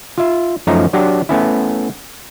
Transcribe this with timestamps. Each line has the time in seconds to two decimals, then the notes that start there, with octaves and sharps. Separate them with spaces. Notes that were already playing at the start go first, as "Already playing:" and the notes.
0.18 F4 E5
0.67 F#2 F3 A3 D#4 C#5 A#5
0.93 F#3 D4 G4 F#5
1.29 A3 B3 C#4 E4